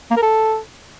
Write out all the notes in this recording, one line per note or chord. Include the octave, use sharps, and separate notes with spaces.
A#3
A#4
A4